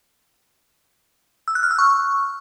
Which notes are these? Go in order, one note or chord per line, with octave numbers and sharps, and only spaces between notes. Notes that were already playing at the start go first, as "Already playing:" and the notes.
E6
F#6
F6
E6
C#6